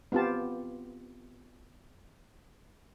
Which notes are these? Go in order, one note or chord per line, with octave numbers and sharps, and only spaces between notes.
B3 C4 F4 G4 A5